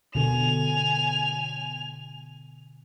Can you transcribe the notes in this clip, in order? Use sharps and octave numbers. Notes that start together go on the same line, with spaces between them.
B2 D3 G#5 F7